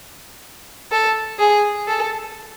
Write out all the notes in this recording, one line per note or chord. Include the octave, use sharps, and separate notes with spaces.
A4
G#4
A4